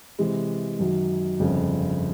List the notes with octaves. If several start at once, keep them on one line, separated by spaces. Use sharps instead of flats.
C3 E3 G#3
F#2 D#3 F#3
G1 F2 C#3